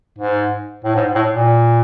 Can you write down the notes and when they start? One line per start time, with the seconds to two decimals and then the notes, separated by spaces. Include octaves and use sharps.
0.18 G#2
0.84 A2
0.96 G#2
1.15 A2
1.35 A#2